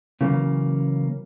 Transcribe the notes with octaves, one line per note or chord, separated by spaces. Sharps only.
C#3 E3 F#3 A#3 C#4